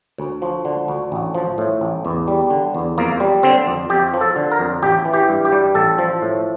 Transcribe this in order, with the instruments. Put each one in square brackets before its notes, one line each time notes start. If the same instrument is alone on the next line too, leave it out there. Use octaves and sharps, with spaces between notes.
[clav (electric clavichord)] D2
F3
D3
D2
A1
F3
A2
A1
E2
G3
D3
E2
F2 A#3
G3
D3 C4
F2
F2 G4
F3
A4
D3
A#4
F2
A1 G4
E3
G4
G2
G4
G3
A1 A4
F3
A2